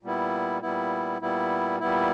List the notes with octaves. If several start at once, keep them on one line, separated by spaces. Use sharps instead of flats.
A#2 G3 B3 E4
A#2 G3 B3 E4
A#2 G3 B3 E4
A#2 G3 B3 E4